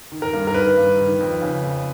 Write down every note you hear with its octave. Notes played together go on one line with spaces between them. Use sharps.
D#3
A#4
G2
A#4
D#3 B4
G2
D#3
F2
C#3
F2